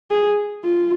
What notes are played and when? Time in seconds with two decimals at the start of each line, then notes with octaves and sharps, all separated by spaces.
0.11 G#4
0.64 F4